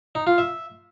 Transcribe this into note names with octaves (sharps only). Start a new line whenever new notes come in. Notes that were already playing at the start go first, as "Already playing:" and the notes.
D#4
F4
E5